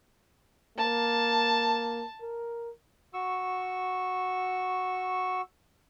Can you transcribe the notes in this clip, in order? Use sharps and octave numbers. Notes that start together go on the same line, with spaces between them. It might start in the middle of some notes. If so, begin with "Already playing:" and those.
A#3 A5
A#4
F#4 C#6 E6